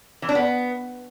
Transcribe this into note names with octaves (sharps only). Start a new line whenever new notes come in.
E3
D4
B3